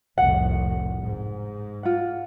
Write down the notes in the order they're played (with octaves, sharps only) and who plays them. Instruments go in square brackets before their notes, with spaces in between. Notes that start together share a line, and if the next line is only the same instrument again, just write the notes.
[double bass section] F1 C2 A2 [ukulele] F#5
[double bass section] G#2
[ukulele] F4 F#5